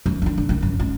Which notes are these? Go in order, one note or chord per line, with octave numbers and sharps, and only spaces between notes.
F#2
D#3 D4
D3
C#3 A#3
F#2
G#3 C#4